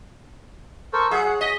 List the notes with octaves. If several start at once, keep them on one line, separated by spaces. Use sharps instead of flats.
A4 A#4 C5 C#6
F#3 G#4 E5 F#5
C#5 F#5
D#5 B6